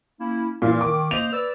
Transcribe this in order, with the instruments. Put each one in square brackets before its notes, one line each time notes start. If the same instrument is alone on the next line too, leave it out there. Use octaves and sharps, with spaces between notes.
[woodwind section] A#3 C#4 E4
[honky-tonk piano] A#2 E3 [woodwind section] F5
[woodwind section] D#3 [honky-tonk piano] D6
[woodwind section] A#3 C5 D#5 [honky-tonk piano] F7
[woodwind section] B4 D5 E6